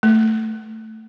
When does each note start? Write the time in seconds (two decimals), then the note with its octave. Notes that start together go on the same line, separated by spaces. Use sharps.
0.03 A3